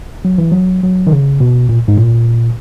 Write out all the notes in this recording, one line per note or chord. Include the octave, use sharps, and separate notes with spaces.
F#3
E3
F#3
F#3
D#3
C#3
B2
A#2
G#2
A#2